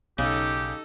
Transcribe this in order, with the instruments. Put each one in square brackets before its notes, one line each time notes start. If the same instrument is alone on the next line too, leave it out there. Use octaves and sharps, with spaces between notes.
[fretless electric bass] B1 [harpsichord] C#3 [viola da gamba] D#4 A4 [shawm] G4